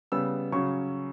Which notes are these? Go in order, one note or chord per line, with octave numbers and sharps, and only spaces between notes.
C#3 G3 B3 E6
C#3 F#3 C#4 C#6